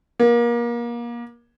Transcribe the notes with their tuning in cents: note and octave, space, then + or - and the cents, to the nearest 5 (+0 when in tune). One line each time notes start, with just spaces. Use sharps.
A#3 +30